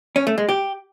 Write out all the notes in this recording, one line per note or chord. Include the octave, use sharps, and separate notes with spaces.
C#4
A3
G#3
G4